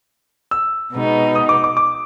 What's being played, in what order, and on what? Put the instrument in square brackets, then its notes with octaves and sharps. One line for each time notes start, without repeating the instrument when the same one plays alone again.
[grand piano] E6
[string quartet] B2 G#3 B3 D#4
[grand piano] D#6
D6
D6
D6